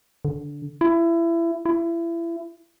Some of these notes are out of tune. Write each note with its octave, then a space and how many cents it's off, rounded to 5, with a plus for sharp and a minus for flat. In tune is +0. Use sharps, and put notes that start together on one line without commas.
D3 -15
E4 +25
E4 +30